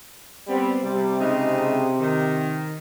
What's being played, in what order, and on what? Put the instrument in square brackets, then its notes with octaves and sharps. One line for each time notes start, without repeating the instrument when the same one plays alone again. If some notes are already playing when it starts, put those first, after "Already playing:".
[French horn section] G3 B3 C4
[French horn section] C3 [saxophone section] G3
[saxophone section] C#3 G#3 D#4
D#3